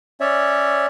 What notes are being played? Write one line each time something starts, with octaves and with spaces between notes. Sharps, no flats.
C#4 C#5 D5 E5